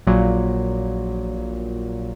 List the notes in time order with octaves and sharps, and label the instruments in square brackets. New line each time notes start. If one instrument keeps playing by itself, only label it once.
[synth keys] A#1 A#2 F#3